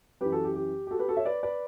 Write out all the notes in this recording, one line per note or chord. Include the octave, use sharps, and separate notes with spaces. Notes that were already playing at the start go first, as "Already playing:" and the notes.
F#2 E3 G4 B4
F#4 A4
G4
G4
G4
F#4 A4
G4 B4
F#4 A4
C#5 E5
B4 D5
B4 D5